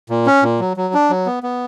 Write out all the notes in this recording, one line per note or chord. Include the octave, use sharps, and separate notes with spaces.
A#2
C#4
A#2
F#3
F#3
D4
F#3
B3
B3